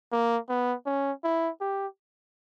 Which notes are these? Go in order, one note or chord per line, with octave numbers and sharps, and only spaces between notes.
A#3
B3
C#4
E4
G4